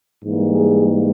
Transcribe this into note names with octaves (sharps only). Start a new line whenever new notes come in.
G#2 E3 G3 A#3
G#4